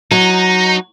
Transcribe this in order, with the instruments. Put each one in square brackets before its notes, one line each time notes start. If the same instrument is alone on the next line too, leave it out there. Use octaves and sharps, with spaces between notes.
[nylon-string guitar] F#3 [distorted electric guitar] D#4